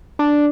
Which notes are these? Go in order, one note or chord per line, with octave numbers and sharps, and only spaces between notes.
D4